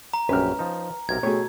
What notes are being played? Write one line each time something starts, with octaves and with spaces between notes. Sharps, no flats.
A#5
A#1 F#2 C#4 G4 B4 G#5 F6
F3 D#4
B1 C3 A#4 G#6
B2 A3 G4 G#4 C#5